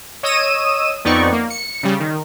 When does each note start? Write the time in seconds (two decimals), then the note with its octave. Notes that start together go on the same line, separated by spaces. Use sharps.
0.23 C#5 D#5 D#6 E6 D#7 E7
1.05 F2 B3 C4 D#4 D5 C#6
1.32 A#3
1.50 C#7
1.83 C#3 G3
2.00 D#3